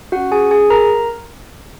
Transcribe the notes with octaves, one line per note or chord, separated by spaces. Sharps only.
F#4 F#5
C#4
G#4 G#5
G#4 G#5
A#4 A#5